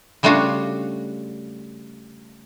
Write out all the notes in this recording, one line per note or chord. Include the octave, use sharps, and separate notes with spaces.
C#3 G3 A3 D4 F4 F#4